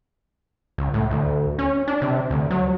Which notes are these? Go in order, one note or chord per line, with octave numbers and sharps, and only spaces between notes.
C#2
A2
D2
C#4
D4
C3
D2
F#3